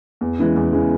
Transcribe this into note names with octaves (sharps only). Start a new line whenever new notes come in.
E2
C#3 E3 G#3
E2
C#3 E3 G#3